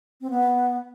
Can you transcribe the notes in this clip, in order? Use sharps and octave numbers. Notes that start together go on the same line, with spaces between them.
C4
B3